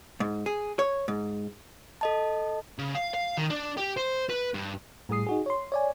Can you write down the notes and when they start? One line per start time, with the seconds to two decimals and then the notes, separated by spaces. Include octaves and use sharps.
0.20 G#2
0.46 G#4
0.79 C#5
1.08 G#2
2.01 A4 D#5 A5
2.79 C#3
2.95 F5
3.15 F5
3.38 D#3
3.50 D4
3.77 G4
3.97 C5
4.29 B4
4.54 G2
5.09 A2 G3 G#4 D#6 C7
5.26 D#4 F#4 G#4
5.46 C#5 C6
5.72 C#5 D5 G#5